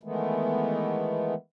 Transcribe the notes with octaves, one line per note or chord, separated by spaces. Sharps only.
D#3 E3 G#3 A3 B3